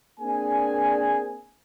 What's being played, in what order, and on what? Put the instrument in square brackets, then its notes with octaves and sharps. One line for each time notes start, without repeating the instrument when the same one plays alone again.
[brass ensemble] A#3 C4 D4 G#4 G#5